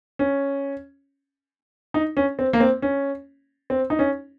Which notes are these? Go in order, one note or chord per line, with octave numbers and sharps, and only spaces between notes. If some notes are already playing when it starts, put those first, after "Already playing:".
C#4
D#4
C#4
C4
A#3
C4
C#4
C4
D#4
C#4